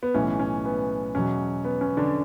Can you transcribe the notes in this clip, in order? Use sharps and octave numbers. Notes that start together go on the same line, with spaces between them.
B3
B1 A2 E3 C#4
C#4
B3
E2 B2 F#3 C#4
B3
C#4
D3 D4